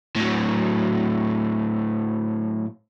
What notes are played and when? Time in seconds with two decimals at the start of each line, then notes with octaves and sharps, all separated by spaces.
0.15 A2 F#3